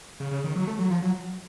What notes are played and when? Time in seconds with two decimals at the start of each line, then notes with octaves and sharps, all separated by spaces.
0.20 C#3
0.31 C#3
0.44 D#3
0.56 F#3
0.67 A3
0.79 F#3
0.91 F3
1.02 F#3